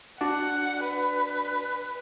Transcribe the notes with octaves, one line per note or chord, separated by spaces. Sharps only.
D4 F#4 D5 F#5
B4